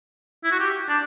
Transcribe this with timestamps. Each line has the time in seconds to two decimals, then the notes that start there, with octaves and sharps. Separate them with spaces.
0.44 E4
0.51 F#4
0.59 G4
0.89 D4